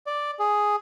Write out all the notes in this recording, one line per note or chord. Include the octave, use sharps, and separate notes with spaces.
D5
G#4